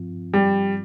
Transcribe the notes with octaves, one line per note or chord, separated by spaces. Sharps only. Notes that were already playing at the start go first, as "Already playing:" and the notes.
Already playing: G2 F3 C4 F4
G3